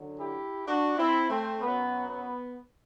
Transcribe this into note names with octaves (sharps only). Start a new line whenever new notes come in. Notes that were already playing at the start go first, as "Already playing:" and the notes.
Already playing: F#2 D3 F#3
E4 G4
D4 F#4
C4 E4
A3 C4
F#2 F#3 B3
B3